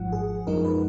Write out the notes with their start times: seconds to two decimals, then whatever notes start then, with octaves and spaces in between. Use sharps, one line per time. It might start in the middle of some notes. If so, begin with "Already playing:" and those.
Already playing: G#1 G#2 F3 F#5
0.12 G#4
0.47 F#2 F3 G#3 D#4 A#4
0.65 B4